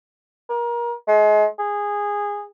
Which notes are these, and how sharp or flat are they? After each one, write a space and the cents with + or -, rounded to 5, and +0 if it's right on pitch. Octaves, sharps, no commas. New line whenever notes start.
A#4 +30
G#3 +35
G#4 -15